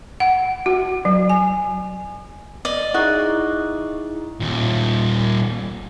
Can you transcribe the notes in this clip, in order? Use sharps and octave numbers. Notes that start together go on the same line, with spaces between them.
F#5
F#4
F#3
G#5
D5 D#5
D#4 E4 F#4 G#4
D#2 A#2